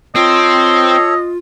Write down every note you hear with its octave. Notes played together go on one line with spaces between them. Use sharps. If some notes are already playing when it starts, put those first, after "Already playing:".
C4 F4 A4 C#5 D#5